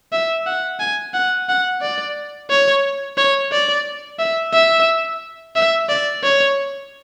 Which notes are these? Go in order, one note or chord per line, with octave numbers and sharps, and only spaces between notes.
E5
F#5
G#5
F#5
F#5
D5
C#5
C#5
D5
E5
E5
E5
D5
C#5